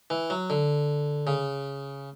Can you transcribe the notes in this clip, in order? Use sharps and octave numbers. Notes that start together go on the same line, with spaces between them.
E3
F#3
D3
C#3